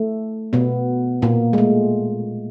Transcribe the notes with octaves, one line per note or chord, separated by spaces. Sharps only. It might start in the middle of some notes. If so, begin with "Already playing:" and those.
Already playing: A3
B2 B3
A#2 A#3
G#3
A3